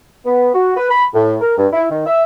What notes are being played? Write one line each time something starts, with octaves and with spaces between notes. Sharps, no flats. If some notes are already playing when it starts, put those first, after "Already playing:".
B3
F#4
B4
B5
A2
A#4
G2
E4
D#3
E5